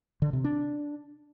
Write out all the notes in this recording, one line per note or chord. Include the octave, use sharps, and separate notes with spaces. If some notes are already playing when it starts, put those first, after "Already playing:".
D3
C3
D4